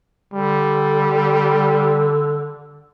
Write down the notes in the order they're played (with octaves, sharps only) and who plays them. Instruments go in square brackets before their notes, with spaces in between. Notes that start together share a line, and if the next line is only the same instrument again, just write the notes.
[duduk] D3 [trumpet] G3